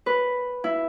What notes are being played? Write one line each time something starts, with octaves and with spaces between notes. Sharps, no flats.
B4
E4